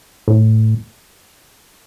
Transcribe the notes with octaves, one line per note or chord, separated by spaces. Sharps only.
A2